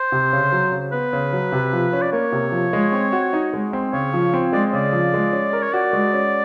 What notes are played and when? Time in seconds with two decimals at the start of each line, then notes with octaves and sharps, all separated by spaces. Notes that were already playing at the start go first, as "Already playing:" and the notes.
Already playing: C5
0.12 C3
0.33 C#3
0.52 F#3
0.72 C#3
0.92 B3 B4
1.13 C#3
1.33 F#3
1.52 C3
1.73 F3
1.93 C#4
2.02 D5
2.13 A#3 C#5
2.32 C3
2.52 F3
2.73 G#3
2.92 C4
3.13 F#4
3.33 D#4
3.53 G#3
3.73 C4
3.93 C#3 C#5
4.13 F3
4.34 C4
4.53 G#3 D5
4.73 C#3 D5
4.93 F3
5.14 G#3
5.33 C#4
5.53 A#4
5.63 C#5
5.73 F#4 D5
5.93 G#3
6.14 C#4